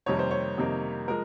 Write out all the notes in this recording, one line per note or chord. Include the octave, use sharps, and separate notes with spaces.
F2 C3 D#3 G3 A#3 C#5
C5
C#5
F2 C3 D#3 G3 A#3
F3 G#3 A#4